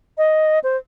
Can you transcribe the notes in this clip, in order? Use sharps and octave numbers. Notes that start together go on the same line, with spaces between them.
D#5
C5